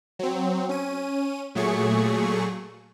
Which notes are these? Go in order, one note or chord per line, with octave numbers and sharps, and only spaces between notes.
F#3 C4
C#4 D#7
A#2 F#3 A3 G#4 C#6